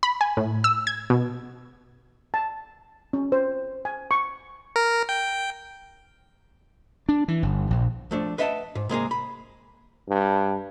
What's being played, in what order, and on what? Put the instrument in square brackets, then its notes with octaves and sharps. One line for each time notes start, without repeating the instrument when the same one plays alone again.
[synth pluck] B5
G#5
A2
E6
G#6
B2
[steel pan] A5
C#4
C5
G#5
C#6
[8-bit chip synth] A#4
G5
[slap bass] D4
E3
G1
A#1
[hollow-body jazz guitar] F3 A3 D4
B4 D#5 E5 F#5 G#5 A5
G#2
C2 G#3 A#3 G#4
B5
[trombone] G2